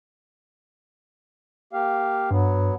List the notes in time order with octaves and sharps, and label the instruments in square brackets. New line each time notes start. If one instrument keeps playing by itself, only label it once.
[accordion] A#3 G4 F5
[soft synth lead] G2 [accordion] F#3 B3